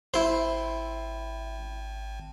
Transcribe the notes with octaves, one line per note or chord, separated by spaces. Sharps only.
G#1 E4 C5